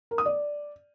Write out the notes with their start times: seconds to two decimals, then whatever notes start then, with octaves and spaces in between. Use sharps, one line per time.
0.11 A#4
0.18 D#6
0.25 D5